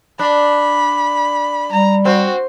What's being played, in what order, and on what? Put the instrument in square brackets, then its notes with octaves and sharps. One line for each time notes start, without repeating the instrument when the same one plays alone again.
[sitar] D4 [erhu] B5
[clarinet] G3 [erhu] A#5
[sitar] C4 [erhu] F#4